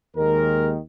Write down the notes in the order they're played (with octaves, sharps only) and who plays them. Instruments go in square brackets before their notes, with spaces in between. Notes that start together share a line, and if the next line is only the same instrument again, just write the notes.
[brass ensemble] D#2 D#3 G#3 A#4